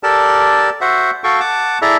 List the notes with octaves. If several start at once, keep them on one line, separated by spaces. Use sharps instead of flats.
G4 A4 A#4 D5 A5
F#4 C5 E5 F#5
F#4 A4 F5 G5 C#6
F#5 A5 D6
E4 G#4 A4 D5 E5 A#5